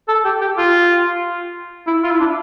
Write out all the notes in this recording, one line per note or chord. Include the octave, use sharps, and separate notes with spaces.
A4
G4
G4
F4
E4
F4
E4
D4